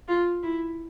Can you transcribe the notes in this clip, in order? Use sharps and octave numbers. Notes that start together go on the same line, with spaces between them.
F4
E4